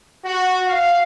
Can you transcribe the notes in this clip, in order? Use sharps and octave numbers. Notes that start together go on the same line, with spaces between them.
F#4
F5